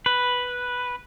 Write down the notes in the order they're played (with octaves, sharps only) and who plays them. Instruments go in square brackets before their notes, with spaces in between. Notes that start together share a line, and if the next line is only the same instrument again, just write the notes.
[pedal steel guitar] B4